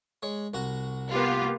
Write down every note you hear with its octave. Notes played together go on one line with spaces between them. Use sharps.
G#3 C#5
C2 F#4 A#5
A#3 B3 F4 G4